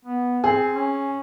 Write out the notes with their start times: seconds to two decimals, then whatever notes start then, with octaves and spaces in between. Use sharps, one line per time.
0.05 B3
0.44 C4 G#4
0.75 C#4